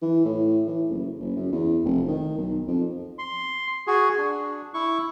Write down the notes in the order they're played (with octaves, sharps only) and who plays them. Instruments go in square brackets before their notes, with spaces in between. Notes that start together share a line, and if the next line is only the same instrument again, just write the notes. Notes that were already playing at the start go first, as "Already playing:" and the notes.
[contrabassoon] E3
A2
E3
F#1
F#1
F#2
E2
F1
D#3
B1
F2
[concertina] C6
F#4 G#4
D4
E4 C#6